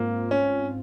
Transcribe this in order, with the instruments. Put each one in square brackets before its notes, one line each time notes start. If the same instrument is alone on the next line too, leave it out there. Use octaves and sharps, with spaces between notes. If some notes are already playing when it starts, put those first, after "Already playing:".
Already playing: [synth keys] G#2 C4 F4 [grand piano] A#3
[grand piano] C#4